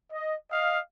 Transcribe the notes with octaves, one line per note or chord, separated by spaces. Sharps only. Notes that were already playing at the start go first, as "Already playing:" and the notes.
D#5
D#5 F5